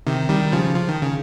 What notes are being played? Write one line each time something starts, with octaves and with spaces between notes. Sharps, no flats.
C3 D#3
D#3 G3
C#3 F3
F3
D#3
C#3